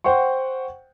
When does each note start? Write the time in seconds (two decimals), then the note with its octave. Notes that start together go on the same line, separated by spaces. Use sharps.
0.04 C5 F#5 G5 C#6